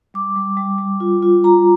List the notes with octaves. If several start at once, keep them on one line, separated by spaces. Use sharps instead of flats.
G3 D6
G3
G3
G3
F4
F4
F4 A#5